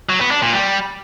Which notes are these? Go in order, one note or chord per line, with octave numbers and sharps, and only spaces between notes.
F#3
B3
D4
A#2
G3